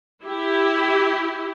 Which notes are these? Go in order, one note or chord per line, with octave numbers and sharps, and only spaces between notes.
E4 G4